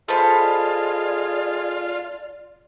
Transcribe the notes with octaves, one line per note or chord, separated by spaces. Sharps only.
G#3 F4 A4 C5 D5 B5